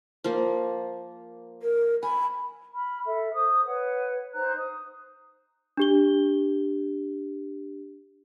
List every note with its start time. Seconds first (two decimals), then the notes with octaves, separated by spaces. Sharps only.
0.24 F3 A#3
1.62 A#4
2.03 G#5 B5
2.72 B5 F6
3.04 A4 E5
3.33 C5 D#6
3.65 B4 C#5 F#5
4.33 D#4 C5 A#5 F#6
4.56 D#6
5.77 D4 G4 G7